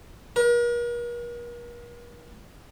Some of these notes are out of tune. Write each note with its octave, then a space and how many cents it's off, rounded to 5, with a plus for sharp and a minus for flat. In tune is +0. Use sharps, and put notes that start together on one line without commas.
A#4 +45